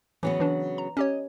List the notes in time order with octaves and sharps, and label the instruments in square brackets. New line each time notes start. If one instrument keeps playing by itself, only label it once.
[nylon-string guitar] C#3 F#3 B3 [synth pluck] E3
[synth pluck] E3 D4
A#5
[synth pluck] C#4 G4 C#5 [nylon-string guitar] D#5